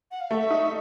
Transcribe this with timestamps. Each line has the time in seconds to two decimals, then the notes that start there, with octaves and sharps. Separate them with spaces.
0.11 F#5
0.20 F5
0.30 A3 E5
0.50 D#4